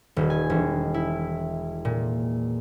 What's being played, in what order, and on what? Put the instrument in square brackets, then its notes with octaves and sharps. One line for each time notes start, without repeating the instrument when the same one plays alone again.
[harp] D#1
G#5
E1
E4
A#2